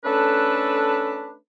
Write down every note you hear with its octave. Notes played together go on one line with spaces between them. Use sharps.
A3 C#4 D4 A4 B4